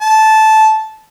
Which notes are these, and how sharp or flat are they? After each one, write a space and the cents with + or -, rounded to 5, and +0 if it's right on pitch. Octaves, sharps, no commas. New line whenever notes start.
A5 -10